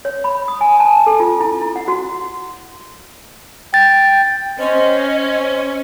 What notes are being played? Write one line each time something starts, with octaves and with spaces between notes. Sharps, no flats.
C#5
B5
D#6
G#5
A5
A4
F4
E4
E4
F#5
F#4
G5 A6
C#4 C5 D#5